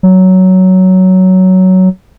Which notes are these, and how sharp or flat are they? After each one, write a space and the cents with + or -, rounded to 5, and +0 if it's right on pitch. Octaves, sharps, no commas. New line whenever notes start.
F#3 +10